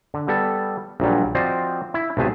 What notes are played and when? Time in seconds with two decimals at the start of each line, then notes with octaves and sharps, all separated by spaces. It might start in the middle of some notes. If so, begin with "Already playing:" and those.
0.14 D3
0.28 G3 B3 A4
1.00 A#1 A#2 F#3 G3
1.35 F3 C4 F#4 C5 D5 D#5
1.94 E4
2.17 B1 C3 A3 G#4 E5